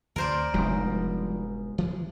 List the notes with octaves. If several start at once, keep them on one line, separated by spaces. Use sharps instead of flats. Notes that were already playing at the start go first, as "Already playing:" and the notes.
D2 A#4 C5 D5
F1 G#2 B2 F3 G3 D4
E3 F3 G#3